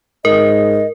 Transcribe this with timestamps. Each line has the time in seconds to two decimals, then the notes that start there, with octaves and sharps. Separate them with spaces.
0.25 G#2 A#4 D#5